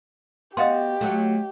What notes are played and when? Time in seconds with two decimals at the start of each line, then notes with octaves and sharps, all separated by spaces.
0.57 B3 F#4 G4 D#5 F5 C6
1.01 F#3 A3